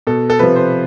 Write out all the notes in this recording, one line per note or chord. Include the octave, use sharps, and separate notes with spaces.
B2 A4
A4
C3 F3 B4
C5